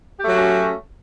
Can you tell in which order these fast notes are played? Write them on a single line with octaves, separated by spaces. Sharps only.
G4 A3 F#3 F#4 C#4